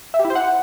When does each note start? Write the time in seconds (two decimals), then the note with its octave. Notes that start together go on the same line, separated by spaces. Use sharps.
0.14 E5
0.19 G4
0.25 E4
0.30 C5
0.35 F#5